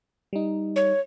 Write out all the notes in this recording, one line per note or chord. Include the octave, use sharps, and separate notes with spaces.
G3 D#4
C#5